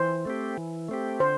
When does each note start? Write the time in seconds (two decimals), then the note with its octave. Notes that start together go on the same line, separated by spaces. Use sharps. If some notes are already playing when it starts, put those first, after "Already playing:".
Already playing: E3 C5
0.25 A3 C4 G4
0.58 E3
0.89 A3 C4 G4
1.20 D3 C5